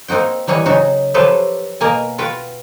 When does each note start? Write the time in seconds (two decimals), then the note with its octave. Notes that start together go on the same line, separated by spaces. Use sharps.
0.08 A#3 C4 D#4 F#4 G5
0.47 E3 F#3 G3 C#5 D#5
0.66 C#3 F#3 D#4 F#4
1.14 F3 F#3 G4 A4 B4 C5
1.81 B2 A#3 A#4 D#5 G#5
2.18 F4 F#4 B4 G5